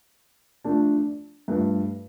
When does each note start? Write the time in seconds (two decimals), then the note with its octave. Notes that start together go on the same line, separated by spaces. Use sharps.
0.64 F3 A3 D4
1.48 G2 F3 A3